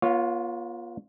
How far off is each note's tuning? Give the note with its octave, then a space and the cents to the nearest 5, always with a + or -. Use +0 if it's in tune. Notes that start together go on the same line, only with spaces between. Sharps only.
B3 -45 F4 +0 C#5 +0